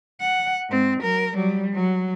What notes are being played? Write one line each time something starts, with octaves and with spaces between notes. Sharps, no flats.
F#5
G#2 C4
F#3 A#4
F#3 G3
F#3